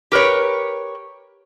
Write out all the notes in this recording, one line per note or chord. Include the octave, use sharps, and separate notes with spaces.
G4 A#4 B4 C#5